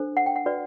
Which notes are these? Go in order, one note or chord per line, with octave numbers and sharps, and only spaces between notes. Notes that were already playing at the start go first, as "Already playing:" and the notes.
Already playing: D4 A4 C5
F#5
G5
F#5
F#4 B4 D5